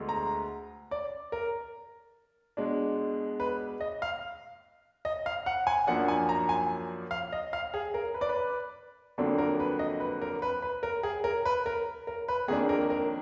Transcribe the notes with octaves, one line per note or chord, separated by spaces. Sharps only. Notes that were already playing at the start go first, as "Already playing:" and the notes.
Already playing: D2 D3 G#3 B3
A#5
D5
A#4
B2 G#3 D4
B4
D#5
F5
D#5
F5
F#5
G#5
F#2 F3 A#3 D4 F#5
G#5
A#5
G#5
F5
D#5
F5
G#4
A#4
B4
D5
B4
F2 D3 F#3 A#3 D4
A#4
B4
D#5
B4
A#4
B4
B4
A#4
G#4
A#4
B4
A#4
A#4
B4
F2 D#3 A#3 D4 G#4
A#4
A#4